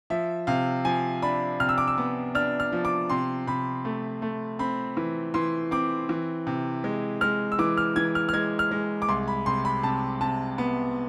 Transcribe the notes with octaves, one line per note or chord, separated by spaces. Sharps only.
F3 E5
C3 F5
F3 G#5
D4 B5
C3 F6
E6
D6
E6
B3
D4 F6
F6
F3
D6
C3 C6
C3 B5
A3
A3
C4 B5
E3
E3 C6
C4 D6
E3
C3
G#3
G#3 F6
E6
E3 D6
F6
E3 G#6
F6
F6
G#3 G#6
F6
G#3
D6
C2 C6
B5
C3 C6
B5
C3 A5
C3 A5
B3